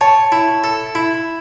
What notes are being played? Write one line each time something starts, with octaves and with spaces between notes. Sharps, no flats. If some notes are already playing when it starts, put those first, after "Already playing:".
C#5 A5
E4
A4
E4